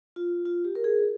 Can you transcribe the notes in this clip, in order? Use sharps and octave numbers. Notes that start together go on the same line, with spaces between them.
F4
F4
G4
A#4
G#4